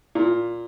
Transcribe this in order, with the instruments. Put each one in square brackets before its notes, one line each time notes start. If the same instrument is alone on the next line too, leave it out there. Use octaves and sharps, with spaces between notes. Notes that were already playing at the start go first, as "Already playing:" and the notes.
[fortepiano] A#2